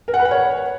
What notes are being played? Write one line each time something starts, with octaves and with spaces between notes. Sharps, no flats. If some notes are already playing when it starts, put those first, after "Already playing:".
A#4
F#5
B4
F#5
C#5